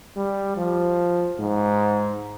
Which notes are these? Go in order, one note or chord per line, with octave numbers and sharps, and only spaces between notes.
G3
F3
G#2